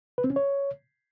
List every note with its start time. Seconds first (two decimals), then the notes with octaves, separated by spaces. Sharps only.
0.18 B4
0.24 C4
0.30 C#4
0.36 C#5